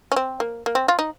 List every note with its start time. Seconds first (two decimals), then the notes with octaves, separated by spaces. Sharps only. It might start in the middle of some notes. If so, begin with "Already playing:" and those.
0.12 C#4
0.16 C4
0.40 A#3
0.66 A#3
0.75 C4
0.88 F4
0.99 D#4